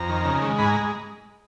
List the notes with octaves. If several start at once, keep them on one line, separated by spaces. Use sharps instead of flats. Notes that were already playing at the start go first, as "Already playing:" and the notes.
Already playing: F2 A#5
D#3
C#3
G#3
G#2 B5
G#5
A#5
G#3